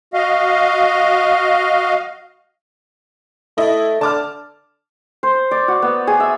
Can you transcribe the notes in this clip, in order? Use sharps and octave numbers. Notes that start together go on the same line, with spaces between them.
F#4 D#5 F5
A3 E4 D#5
D3 A5 D6 F6
C5
D5
F#4
B3
G#4
E5